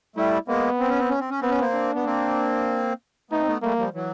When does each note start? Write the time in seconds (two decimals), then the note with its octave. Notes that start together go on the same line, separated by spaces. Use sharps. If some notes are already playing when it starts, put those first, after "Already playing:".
0.16 G3 A3 E4
0.48 G#3 A#3 B3
0.80 C4
0.89 C#4
0.99 C4
1.09 C#4
1.20 C4
1.30 C#4
1.41 B3 C4
1.50 C#4
1.60 A#3 C4
1.74 D4
1.95 B3
2.05 A#3 C4
3.31 A3 B3 D#4
3.41 C4
3.47 A3 B3
3.62 G3 A3 A#3
3.78 F3 G3
3.94 E3 F#3